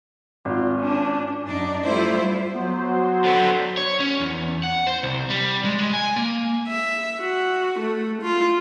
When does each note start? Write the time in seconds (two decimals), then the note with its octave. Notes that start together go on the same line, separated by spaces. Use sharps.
0.45 G#1 F4
0.76 C#4 D4
1.45 F#2 D4 D#4
1.85 G3 A3 E4 F4 C5
2.54 F#3 B3 C5
2.88 F#4
3.25 D3 B3 A4
3.77 C#5
4.00 C#4
4.21 E2
4.63 F#5
4.87 C5
5.03 C2
5.30 G3
5.65 G#3
5.79 G#3
5.93 G#5
6.16 A#3
6.68 E5
7.20 F#4
7.80 A3
8.22 F4